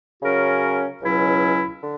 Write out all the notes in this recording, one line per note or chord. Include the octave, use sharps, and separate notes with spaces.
C#3 F#3 C#4 F#4 A#4
C#2 B2 F#3 C#4 E4
D3